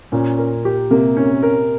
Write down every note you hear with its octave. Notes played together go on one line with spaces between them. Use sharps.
A#2 C#4
A#4
G4
C3 A#3
C#4
A#4